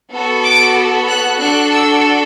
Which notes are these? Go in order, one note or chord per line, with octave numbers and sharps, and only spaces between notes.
B3 F#4 A4
D6
F#6
D4 F#4 A4 F#6
E6